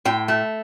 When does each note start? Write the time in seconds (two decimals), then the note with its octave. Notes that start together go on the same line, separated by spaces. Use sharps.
0.05 A2 G5
0.28 A3